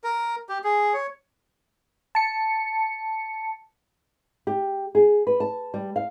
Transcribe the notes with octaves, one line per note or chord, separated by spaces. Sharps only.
A#4
G4
G#4
C#5
A5 C#7
G4
G#4
B4
A5
G3
F5